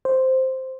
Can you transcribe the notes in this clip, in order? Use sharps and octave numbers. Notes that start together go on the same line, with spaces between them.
C5